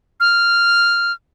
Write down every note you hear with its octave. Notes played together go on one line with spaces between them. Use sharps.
F6